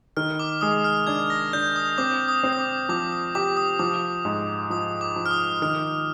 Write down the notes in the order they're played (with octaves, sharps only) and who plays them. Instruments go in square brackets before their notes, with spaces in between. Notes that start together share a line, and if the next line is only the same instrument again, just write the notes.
[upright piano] D#3 [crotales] F6
[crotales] D6
[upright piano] G#3 [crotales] D#6
[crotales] F6
[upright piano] D4 [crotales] G#6
[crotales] A#6
[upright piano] D4 [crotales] G6
[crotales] D#6
[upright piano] C4 [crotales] D6
[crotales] D#6
[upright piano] C4
[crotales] D#6
D6
[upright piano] F3 [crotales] D6
[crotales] D#6
[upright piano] G4 [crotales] D6
[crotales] D#6
[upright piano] F3 [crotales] D6
[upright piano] G#2
[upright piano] F3 [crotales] D#6
[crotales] D6
[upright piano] F3
[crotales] F6
D#6
[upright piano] D#3 [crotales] F6